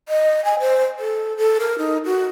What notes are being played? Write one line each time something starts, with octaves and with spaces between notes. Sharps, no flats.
D#5
G#5
C5
A4
A4
A#4
D#4
F#4